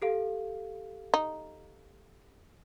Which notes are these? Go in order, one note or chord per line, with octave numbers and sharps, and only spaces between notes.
G4 A4 F5
D#4